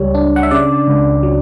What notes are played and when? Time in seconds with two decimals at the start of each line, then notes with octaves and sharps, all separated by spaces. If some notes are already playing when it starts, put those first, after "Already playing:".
Already playing: C#2 G3 C#5
0.14 D4
0.36 F#5
0.43 E5
0.51 C#3 D5
0.87 C#2
1.23 F#3